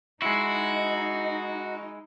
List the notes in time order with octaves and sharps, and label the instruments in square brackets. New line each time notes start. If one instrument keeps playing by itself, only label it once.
[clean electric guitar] G#3 E4 [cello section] D#4 [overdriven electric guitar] F#4